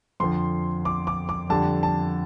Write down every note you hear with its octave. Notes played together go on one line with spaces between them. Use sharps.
F2 D3 F3 C6
D6
D6
D6
F2 D3 G3 A5
A5